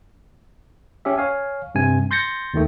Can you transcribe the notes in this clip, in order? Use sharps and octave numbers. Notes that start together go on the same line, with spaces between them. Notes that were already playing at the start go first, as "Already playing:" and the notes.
C#4 G4 E5
C#5 F5 G#5
G2 C3 G#5
C6 G6 A6 A#6 C#7
D#2 D#3 A3